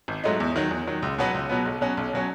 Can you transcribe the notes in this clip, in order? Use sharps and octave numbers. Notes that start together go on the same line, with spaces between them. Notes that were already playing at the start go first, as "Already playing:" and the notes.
G#1
G#2 F#3 A3 D#4
E2
D#3 F#3
E2
D#3 F#3
C#2
B2 F#3 B3
C#2
B2 F#3 B3
B1
B2 F#3 C#4
B1
B2 F#3 C#4